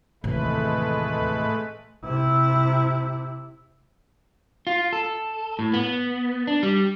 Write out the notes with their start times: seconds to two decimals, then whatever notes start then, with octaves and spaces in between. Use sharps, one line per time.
0.24 D#2 A2 C3 E3 G#3 A3 B4
2.04 C3 E4
4.67 F4
4.93 A4
5.59 A2
5.74 B3
6.47 D4
6.63 G3